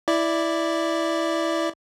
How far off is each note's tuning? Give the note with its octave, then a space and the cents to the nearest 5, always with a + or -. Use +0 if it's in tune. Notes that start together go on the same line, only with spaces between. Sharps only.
E4 +0 D5 +0